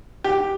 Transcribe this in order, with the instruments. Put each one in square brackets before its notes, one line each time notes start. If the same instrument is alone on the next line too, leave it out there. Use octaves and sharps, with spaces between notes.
[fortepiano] G4